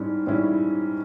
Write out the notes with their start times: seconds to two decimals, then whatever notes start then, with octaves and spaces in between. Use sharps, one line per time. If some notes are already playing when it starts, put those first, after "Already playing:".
Already playing: G#2 G3 C#4 E4
0.27 G#2 G3 C#4 E4